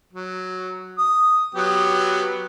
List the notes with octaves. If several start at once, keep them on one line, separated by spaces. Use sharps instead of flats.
F#3
D#6
F#3 B3 G4